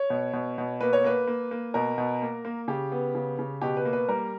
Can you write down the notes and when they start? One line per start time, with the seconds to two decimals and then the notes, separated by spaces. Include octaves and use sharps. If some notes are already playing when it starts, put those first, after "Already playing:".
Already playing: C#5
0.10 B2
0.33 B2
0.58 B2
0.81 A#3 B4
0.93 C#5
1.04 A#3 B4
1.27 A#3
1.51 A#3
1.74 B2 A#4
1.98 B2
2.22 A#3
2.45 A#3
2.68 C#3 G4
2.92 B3
3.15 C#3
3.39 C#3
3.62 B2 G4
3.77 B4
3.85 A#3
3.93 B4
4.08 G3 A#4